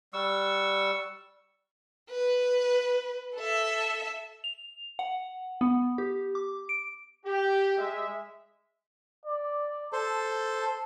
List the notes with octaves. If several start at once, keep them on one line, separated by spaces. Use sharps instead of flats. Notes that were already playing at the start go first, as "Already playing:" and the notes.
G3 F#5 C#6 E6
B4
A4 E5
F7
F#5
B3
G4
D6
D7
G4
G#3 E5
D5
A4 C5 A5